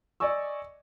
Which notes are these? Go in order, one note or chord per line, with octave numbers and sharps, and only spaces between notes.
D5 D#5 G#5 C#6 E6